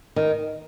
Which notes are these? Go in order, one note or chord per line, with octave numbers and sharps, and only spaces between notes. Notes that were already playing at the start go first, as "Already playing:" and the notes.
D#3